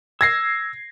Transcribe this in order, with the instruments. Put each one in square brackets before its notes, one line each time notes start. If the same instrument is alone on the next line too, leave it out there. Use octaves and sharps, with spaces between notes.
[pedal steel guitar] E6 [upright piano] G#6 A#6 C7